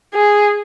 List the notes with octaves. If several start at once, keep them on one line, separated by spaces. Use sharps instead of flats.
G#4